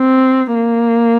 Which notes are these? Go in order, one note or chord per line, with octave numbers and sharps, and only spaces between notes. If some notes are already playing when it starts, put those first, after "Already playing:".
Already playing: C4
A#3